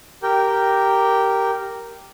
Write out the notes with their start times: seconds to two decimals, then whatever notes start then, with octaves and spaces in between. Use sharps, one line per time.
0.23 G4 A#4 G5